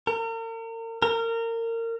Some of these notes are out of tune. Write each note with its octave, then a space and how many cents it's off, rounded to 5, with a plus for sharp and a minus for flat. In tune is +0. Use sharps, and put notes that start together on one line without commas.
A#4 -40
A#4 -25